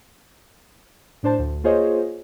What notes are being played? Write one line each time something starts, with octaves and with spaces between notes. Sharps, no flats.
A2 D4 C5 A5
D2
A#3 F4 G#4 C5 C#5 D#5